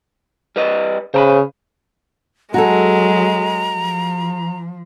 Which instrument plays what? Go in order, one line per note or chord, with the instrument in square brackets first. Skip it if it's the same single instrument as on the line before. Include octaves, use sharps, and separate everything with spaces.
[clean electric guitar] G3 B4 D#5
[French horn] C#3 [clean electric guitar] C5 A#5 B5
[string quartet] F#3 G#3 [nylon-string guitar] F#4 G#4 A4 [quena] A#5
[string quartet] F3